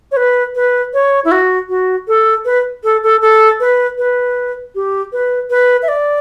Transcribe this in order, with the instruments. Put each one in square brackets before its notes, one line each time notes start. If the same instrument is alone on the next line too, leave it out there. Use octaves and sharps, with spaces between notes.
[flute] C#5
B4
B4
C#5
E4
F#4
F#4
A4
B4
A4
A4
A4
B4
B4
G4
B4
B4
E5
D5